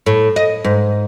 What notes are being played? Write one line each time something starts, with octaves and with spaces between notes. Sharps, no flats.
A2
D#5
G#2